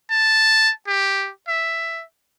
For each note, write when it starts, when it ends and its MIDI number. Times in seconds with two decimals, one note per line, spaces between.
0.10 0.72 81
0.87 1.30 67
1.48 2.03 76